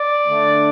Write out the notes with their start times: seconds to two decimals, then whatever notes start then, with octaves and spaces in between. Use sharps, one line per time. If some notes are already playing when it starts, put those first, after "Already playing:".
Already playing: D5
0.27 D3 A3 D4